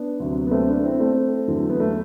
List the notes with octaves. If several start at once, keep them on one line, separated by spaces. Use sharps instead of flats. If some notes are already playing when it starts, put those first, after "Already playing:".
Already playing: B3 D4
D2 C3 F#3
B3
A3 C4
B3 D4
C4 E4
A3 C4
E2 D3 F#3
B3
A3